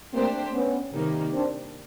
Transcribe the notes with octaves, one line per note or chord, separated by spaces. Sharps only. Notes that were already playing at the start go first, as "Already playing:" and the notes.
A3 A#3 C4 D4 G4 C5
B3 C#4
C3 D#3 G3 A#3 D#4
C4 D4